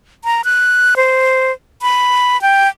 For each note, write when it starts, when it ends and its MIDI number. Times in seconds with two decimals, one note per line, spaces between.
0.24 0.42 82
0.45 0.94 90
0.97 1.52 72
1.82 2.40 83
2.42 2.68 79